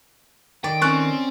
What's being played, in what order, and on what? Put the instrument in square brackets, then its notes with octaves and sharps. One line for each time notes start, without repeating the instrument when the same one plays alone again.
[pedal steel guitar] D#3 [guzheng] D5 [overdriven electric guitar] G5
[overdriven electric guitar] C4 [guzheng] C#4 D5 [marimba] C#6 F#6